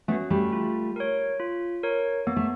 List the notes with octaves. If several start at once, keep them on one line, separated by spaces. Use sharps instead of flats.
A3 B3 C#4 F#4
G3 A3
F4
A#4 C#5
F4
A#4 C#5
A#3 B3
A3